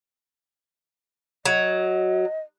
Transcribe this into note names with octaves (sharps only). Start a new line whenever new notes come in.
F#3 D#5